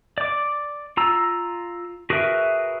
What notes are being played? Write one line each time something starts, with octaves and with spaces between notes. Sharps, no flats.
D5 D6
F4 A#5 E6
F#4 G#4 A#4 B4 E5